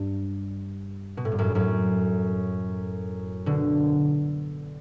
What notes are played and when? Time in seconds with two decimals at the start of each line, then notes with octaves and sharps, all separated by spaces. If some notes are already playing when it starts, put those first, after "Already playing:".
Already playing: G2
1.17 B2
1.25 A2
1.32 G2
1.38 F#2 A2
1.55 F#2 A2
3.46 B2 D3